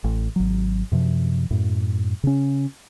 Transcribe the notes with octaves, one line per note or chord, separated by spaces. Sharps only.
A1
G#1 F#3
F#2 C3 F3
F#2 A2
C#3 C#4